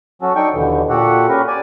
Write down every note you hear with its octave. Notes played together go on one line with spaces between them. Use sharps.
F#3 C#4 F#4 A4
D4 D#4 A4 G5 C#6
D#2 B2 D3 E3
A#2 F#4 G4 A4 F#5
C#4 G4 A#4 B4
D5 G#5